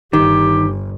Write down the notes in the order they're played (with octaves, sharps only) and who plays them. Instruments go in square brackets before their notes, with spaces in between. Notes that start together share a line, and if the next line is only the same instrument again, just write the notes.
[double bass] G1 [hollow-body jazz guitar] D#3 [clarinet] G4